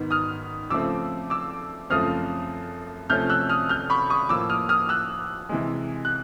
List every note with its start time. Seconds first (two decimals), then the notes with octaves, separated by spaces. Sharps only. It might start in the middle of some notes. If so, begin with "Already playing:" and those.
Already playing: G#2 D#3 B3
0.11 D#6 F6
0.70 C#3 F3 A3 C4 D6 E6
1.30 D6 E6
1.90 F#2 C#3 F3 A3 C4 D#6 F6
3.10 C3 F3 A3 C#4 F6 G6
3.30 E6 F#6
3.49 D#6 F6
3.69 F6 G6
3.90 B5 C#6
4.10 C#6 D#6
4.29 A2 F3 A#3 D6 E6
4.49 D#6 F6
4.69 D#6 F6
4.89 E6 F#6
5.49 C3 E3 G#3
6.05 F#6